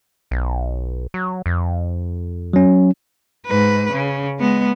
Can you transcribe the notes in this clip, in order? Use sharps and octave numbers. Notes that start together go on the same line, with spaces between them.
B1
F#3
F2
F#3 C#4
G#2 B4
C#3
G#3 B3